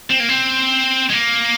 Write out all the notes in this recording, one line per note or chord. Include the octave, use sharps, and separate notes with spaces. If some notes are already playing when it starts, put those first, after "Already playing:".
C4
A#3
C4
G#3
A#3